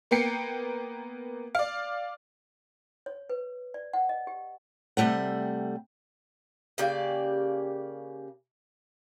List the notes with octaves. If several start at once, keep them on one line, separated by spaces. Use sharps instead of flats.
A#3 B3 G5 C7 C#7
D5 F5
C#5
B4
D5
F#5
D#5
G4
C3 D#3 G3 A3 F#5
C#3 A#3 G4 D5